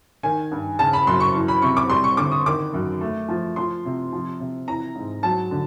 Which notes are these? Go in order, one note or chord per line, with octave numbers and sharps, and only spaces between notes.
D#3 G#5
G2
C#3 A5
B5
F#2 C6
C#6
E3
B5
C3 C#6
D6
G3 C6
C#6
D3 D6
D#6
D#3 D6
F#2
A3
F3
F3 C6
C3
F3
C3
E3 A#5
G#2
F#3 A5
D3